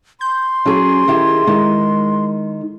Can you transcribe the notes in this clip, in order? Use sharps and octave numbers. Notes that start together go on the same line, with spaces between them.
C6 G6
F#3 C#4 G#4
D#3 E4 G4 G#4
D#3 G#3